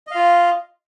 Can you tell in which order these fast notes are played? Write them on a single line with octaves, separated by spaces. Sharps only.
D#5 F5 F4